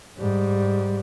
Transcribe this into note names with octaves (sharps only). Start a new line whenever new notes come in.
G#2 G3